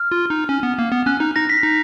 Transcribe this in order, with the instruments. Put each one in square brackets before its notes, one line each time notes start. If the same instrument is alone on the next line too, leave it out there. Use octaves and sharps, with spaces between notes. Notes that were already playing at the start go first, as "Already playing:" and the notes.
Already playing: [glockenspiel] F6
[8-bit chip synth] F4
D#4
C#4
B3
A#3
B3
[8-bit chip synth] C#4 [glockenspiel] F#6
[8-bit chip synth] D#4
[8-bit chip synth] D#4 [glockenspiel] A#6
[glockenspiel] B6
[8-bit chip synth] D#4